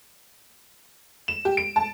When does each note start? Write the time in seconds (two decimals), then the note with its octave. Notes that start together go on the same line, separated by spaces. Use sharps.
1.28 E7
1.45 G4
1.57 D7
1.76 A5